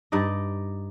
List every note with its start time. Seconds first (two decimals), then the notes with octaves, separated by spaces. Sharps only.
0.12 G2 D#4 D5 D#5